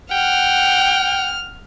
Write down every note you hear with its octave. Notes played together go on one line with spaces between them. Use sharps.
F#5 G5 F6